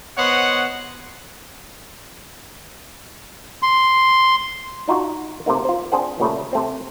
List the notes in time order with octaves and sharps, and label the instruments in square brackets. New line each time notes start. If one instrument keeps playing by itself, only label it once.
[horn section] B3 C5 C#5 D#5 F#5
[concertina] C6
[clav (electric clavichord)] D4 D#4 F4 F#4
C3 A3 A#3 D#4
F4 C5
C4 D4 G#4 C5 F#5
A#2 C#3 G3 A3
C3 A3 C4